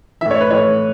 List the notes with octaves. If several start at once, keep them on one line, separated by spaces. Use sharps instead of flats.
A2 E3 E5
C#5
B4
A2 E3 C#5